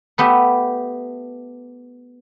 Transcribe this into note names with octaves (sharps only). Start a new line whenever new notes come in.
A3 B3 G4 E5